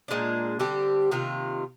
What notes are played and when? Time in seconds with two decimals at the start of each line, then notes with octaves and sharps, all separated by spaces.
0.08 A#2 G#3 D4
0.59 D3 G3 C4 G4
1.11 C3 D#3 A#3 F4